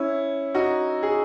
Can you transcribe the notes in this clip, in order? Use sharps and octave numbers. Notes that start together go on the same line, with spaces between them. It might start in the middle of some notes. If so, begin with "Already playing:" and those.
Already playing: C#4 E4
D#4 F#4
G#4